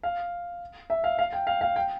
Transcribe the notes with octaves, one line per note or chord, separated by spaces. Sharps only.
F5
E5
F5
F5
G5
F5
F5
G5